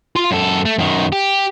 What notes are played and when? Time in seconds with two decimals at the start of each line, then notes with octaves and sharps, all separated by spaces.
0.16 F4 C6
0.31 F#2 A4
0.65 A3
0.78 F#2 D#3
1.12 G4